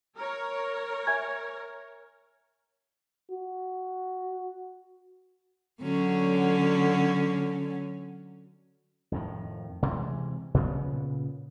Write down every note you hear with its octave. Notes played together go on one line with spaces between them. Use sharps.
A#4 C#5
E5 G#5 G#6
F#4
D3 F#3 C#4
F2 A2 D#3
C3 E3 G#3
A#2 C#3 B3